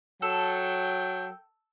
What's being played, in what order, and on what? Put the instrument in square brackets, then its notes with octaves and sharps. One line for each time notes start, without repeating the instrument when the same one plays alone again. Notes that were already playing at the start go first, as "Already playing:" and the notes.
[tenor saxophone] F#3 [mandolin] A4 [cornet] G5